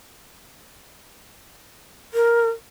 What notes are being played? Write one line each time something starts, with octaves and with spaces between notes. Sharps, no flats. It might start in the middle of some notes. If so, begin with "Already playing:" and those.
A#4